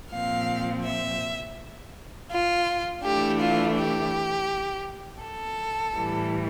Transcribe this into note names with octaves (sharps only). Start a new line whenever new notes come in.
A#2 F3 C4 F5
E5
F4
E3 A3 D4 G4
F4
G4
A4
A2 E3 G3